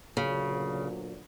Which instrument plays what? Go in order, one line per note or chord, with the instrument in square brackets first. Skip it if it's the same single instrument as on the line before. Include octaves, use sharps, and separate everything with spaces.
[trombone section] D2 A#2 F#3 [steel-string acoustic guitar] C#3